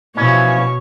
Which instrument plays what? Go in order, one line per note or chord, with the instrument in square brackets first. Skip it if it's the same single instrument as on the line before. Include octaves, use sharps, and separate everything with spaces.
[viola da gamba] B2 [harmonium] E3 F3 E4 [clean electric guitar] C#4 [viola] C#5